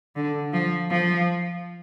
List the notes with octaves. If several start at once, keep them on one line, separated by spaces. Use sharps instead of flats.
D3
F3
F3